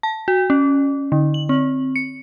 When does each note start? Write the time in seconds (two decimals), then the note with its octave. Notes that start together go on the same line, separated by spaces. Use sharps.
0.03 A5
0.28 F#4
0.50 C#4
1.12 D3
1.34 F#7
1.49 C4
1.96 C#7